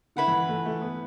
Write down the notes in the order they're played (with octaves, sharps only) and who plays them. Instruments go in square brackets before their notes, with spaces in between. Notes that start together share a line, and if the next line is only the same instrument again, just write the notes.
[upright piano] D3 [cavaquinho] E4 B4 F#5
[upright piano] E3
A3
A3
B3